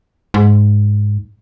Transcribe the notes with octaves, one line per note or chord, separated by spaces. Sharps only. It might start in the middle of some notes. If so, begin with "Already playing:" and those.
G#2